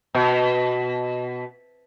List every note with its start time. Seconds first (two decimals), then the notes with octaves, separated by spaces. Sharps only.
0.14 B2